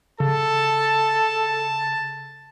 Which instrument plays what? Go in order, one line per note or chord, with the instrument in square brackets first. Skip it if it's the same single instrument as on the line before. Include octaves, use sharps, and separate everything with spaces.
[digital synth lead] C#3 [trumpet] A4 [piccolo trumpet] A5